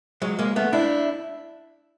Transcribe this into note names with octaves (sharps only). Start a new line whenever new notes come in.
F#3 G#3
G#3 A#3
A3 B3
D4 E4